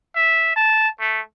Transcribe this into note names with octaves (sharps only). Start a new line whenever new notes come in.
E5
A5
A3